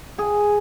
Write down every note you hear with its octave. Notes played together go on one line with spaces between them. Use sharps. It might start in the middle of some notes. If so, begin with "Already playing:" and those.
G#4